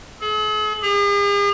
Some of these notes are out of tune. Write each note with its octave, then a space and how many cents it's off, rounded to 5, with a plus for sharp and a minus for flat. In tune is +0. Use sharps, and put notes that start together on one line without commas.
G#4 +45
G#4 -45